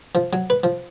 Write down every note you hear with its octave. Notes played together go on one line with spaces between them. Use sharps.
F3
F#3
B4
F3